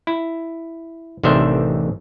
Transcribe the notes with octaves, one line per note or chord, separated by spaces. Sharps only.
E4
A1 C3 D#3 D4 C5 E5